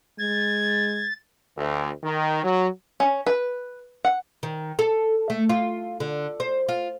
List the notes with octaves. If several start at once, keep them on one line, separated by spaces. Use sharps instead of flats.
G#3 G#6 A6
D2
D#3
F#3
C#4
B4
F#5
D#3
A4
A3
F4
D3
C5
F4